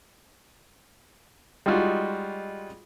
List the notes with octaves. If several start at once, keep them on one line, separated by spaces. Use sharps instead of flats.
G3 G#3 D#4 F4 F#4